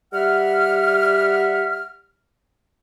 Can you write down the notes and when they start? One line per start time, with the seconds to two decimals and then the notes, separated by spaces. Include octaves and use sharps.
0.13 G3 E5 F#5 F6